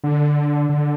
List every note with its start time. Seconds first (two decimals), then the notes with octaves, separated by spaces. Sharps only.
0.04 D3
0.69 D3